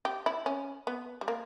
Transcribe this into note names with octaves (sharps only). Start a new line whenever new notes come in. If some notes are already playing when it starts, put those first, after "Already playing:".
G4
E4
C#4
B3
G3
A#3